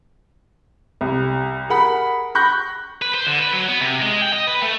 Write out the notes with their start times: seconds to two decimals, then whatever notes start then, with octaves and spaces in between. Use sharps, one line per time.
1.01 C2
1.69 G#4 A#4 F#5 B5
2.35 B5 C#6 F#6 G6 A#6
3.02 B4
3.14 C5
3.26 D3
3.40 B4
3.53 F#3
3.68 B3
3.81 C3
4.02 G#3
4.22 G5
4.33 D#5
4.47 B4
4.62 A3